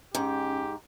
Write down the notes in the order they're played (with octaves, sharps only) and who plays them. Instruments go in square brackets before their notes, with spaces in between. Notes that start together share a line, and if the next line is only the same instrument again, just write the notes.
[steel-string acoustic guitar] G#2 [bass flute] C#4 [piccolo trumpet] G4